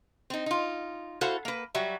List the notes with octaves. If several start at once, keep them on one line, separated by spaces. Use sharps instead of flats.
C4 D#4
D#4 F4
E4 F#4 A4 C5 F5
A#3 B4
F#3 G3 F#4 E5